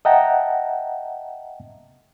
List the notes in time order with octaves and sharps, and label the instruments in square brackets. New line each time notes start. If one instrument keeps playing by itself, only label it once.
[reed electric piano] D#5 E5 F#5 G5 A5 A#5